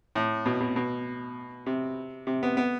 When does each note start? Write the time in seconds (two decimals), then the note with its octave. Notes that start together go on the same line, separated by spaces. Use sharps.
0.15 A2
0.46 B2
0.61 B2
0.76 B2
1.66 C3
2.27 C3
2.43 B3
2.57 B3